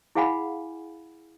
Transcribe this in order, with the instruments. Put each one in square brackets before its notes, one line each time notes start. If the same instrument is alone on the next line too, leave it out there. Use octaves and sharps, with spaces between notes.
[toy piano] E4 G#4 F5 F#5 G#5 B5